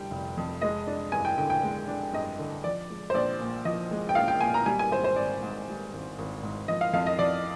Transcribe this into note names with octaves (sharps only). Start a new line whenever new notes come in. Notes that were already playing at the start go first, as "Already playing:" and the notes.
Already playing: F1 D3 G3 G5
F1
F2
G#3 D#5
D4
G2 G#5
G5
D3 G5
G5
G#3
D4
G2 D#5
D3
F3 D5
G#3
C5
A#1 D5
A#2
F3 D#5
G#3
G5
A#1 F5
G5
A#2 G#5
A#5
G3 G#5
G#5
G#1 C5
C5
G#1 D5
G#2
G3
G#1
G#1
G#2
F3 D#5
F5
F2 F5
D#5
F2 D5